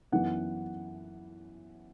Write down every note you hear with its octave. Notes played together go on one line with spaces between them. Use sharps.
F#2 E3 B3 F#5